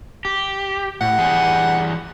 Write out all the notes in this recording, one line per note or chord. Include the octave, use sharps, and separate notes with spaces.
G4
A2 F#5
E3 G3 G#4